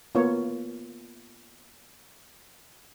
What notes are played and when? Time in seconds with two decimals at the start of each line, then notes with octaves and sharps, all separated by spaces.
0.15 A#3 B3 F4 C#5